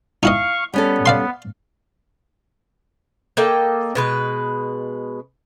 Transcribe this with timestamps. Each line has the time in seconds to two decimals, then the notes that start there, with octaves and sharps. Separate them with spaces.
0.23 D#4 E4 D#5 F5 C#6
0.74 G3 B3 C#4 A4
1.06 D5 F5 C6
3.37 A#3 A4 D#5 G5
3.95 B2 G#3 B4